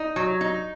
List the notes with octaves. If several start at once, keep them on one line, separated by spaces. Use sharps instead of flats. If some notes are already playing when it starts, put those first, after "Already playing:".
Already playing: D#4
F#3
D#4